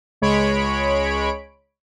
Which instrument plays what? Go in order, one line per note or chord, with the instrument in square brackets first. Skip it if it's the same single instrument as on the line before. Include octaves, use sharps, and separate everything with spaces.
[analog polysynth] C#2 G#3 C#5 B5 D7